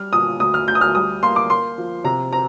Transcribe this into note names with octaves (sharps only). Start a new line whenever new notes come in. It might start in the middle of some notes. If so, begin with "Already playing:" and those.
Already playing: G3 F6
A#2 D#6
D2 D#6
F6
D2 G6
D#6
F6
G3 D#6
A#3 C6
D6
A#3 C6
F3
C3 A#5
C4 A#5